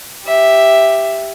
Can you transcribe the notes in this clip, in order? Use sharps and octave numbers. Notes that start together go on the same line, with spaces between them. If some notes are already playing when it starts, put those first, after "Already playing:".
G4 E5